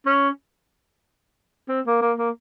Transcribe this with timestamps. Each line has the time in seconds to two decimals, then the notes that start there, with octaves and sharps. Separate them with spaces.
0.06 C#4
1.69 C4
1.86 A#3
2.01 A#3
2.18 A#3